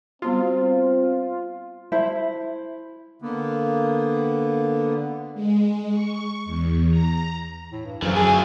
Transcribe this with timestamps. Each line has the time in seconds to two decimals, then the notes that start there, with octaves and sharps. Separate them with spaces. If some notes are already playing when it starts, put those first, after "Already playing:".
0.22 G3 B3 C4 F4 F#4
1.92 E4 C5 A5
3.22 D3 A#3 B3
5.34 G#3
5.91 C#6
6.45 E2
6.89 A#5
7.72 A2
7.86 G2
8.02 F#2 D3 E3 F3
8.15 D3 B3 G#4
8.27 F4 G#5